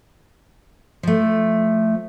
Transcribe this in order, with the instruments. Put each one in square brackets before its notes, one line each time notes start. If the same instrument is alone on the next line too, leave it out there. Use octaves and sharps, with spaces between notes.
[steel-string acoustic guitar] F3 A3